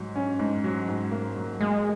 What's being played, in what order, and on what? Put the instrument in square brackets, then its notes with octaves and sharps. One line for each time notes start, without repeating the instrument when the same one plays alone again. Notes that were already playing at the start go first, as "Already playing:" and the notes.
Already playing: [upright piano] G#2 F#3
C#4
G#2
F#3
G#2
A#3
F#3
[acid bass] G#3 [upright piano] A#3